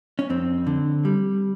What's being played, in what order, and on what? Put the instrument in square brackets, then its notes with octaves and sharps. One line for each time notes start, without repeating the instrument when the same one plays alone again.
[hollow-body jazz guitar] C#4
F2 C4
D3
G3